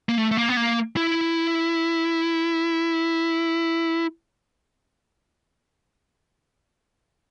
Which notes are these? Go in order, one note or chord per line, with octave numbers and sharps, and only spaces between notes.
A#3
A3
A3
A#3
B3
A#3
E4